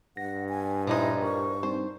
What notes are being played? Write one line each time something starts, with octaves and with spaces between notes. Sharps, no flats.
G2 F#5 A#6
G#5
A#2 F3 G#3 D#4 E4
A#4 C5 C#6
G3 C4 D#4 C5